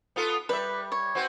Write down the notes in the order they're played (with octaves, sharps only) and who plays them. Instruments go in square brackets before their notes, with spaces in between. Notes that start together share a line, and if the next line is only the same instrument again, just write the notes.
[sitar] B3 F4 A4
[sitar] G3 E5 [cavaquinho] B4
[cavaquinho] C#5
[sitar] C4 F#4 B4